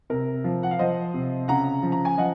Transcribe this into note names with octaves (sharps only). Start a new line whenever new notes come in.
C3 A#4
F3
F#5
F5
F3 C5 D#5
C3
C#3 F#5 A#5
F3
A#5
G#5
F3 D#5 F#5